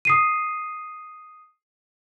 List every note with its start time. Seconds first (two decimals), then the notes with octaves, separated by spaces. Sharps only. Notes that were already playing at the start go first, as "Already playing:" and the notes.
0.05 D#6 C7 D#7